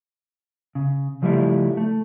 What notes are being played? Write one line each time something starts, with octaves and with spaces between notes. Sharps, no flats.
C#3
C#3 F3 G3 A3 E4
A3